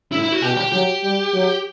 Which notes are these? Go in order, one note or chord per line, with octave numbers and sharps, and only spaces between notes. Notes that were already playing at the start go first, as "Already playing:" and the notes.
A2 E4
E4
F#4
B2 G4
G4
F#3 G4
G3
F#3